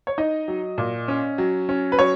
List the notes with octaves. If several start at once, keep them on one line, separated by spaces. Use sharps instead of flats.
C#5
D#4 D#5
F#3
A#2
C#4
F#3
C#4
B4
F#3 C#5